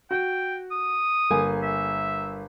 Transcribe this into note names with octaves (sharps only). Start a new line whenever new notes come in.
F#4 G5
D#6
G1 A#3 G#5
E5